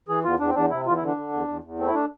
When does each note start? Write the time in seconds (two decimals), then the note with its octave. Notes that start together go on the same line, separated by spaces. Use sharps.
0.08 E3 G#4
0.24 E2 F4
0.40 E2 D4
0.47 C4
0.55 E2 D4
0.71 C3 E4
0.86 E2 F4
0.97 E4
1.01 D3
1.07 D4
1.17 D3
1.33 E2
1.48 E2
1.64 E2
1.79 A3 C4
1.87 E4
1.95 D4